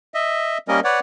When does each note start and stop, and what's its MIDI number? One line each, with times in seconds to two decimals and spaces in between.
0.14 0.58 75
0.14 0.58 76
0.68 0.80 55
0.68 0.80 58
0.68 0.80 61
0.68 0.80 70
0.68 0.80 75
0.84 1.00 71
0.84 1.00 73
0.84 1.00 74
0.84 1.00 78